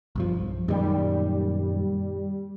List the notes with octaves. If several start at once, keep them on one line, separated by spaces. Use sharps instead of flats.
B1 G2 F3
F#2 A#2 D#3 G3